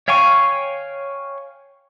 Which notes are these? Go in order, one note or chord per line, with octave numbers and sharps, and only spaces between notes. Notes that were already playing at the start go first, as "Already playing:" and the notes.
C#5 F5 G5 G#5 C#6